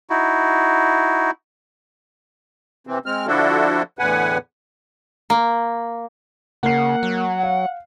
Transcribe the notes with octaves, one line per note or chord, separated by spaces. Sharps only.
D#4 E4 F#4
C3 E3 C4
G#3 C4 F6
D3 F3 D4 E4 F#4 A4
E2 A2 D3 B4 F#5 G#5
A#3
C#3 A#3 F#5 C7
F#3
F5